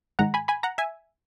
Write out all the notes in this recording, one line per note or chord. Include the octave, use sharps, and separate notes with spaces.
G#2 D#3 G#3 F#5 A#5
G#5 B5
G#5 B5
F#5 A#5
E5 G#5